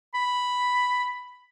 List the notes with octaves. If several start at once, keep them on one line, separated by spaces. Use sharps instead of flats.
B5